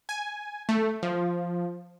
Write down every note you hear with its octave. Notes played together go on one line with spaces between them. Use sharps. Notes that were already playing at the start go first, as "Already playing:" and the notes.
G#5
A3
F3